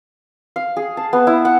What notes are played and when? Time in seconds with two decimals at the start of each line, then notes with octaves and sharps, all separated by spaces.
0.56 F5
0.77 G#4
0.97 A5
1.13 B3
1.27 E4
1.45 F#5